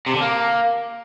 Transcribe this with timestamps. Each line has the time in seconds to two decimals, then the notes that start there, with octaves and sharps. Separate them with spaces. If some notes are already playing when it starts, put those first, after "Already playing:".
0.06 C3
0.14 D3
0.21 A#3